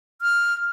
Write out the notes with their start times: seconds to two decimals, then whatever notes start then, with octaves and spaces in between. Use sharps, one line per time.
0.22 F6